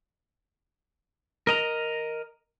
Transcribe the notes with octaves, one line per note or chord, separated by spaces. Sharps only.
A#4 D#5 A#5